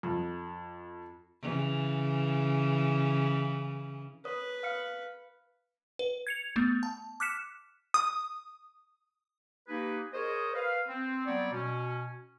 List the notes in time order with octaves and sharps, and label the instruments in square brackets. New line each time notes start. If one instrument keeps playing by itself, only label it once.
[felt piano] F2
[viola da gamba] C#3 E3
[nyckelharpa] B4 [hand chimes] C#5 D#6
[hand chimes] F5 F6 C#7
[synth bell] B4
G#6 C#7 F7
A3 B3
A5
D6 F6 F#6 B6 C#7 E7
[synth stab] D#6
[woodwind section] A#3 D#4 G4 G#4 B4
G#4 A#4 C5 C#5 D#5
B4 F5
C4
F#3 G3 B3 C4 C#5 D5
B2 C#4